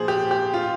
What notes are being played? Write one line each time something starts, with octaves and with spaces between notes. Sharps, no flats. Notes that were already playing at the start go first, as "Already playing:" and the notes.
Already playing: A#2 F3 G#4 C5
G4
G4
F4